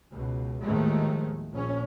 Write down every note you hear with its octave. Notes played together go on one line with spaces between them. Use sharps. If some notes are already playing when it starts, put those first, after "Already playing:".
C#2 B2
D#2 A2 D#3 F3 G#3 A3
A#1 C#4